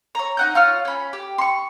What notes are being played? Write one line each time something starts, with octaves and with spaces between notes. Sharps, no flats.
C#5 A#5
D#4 F#5 G6
F4 C#5 F6
C#4 B5
G4
C6 C#6